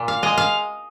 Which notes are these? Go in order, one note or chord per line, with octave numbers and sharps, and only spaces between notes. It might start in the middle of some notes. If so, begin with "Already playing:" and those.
Already playing: A#2
F5
G#3 D#5
F5